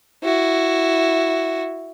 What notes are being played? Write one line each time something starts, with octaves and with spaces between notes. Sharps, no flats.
E4 F#4